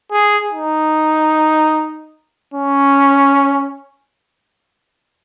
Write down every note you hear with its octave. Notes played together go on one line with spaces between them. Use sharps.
G#4
D#4
C#4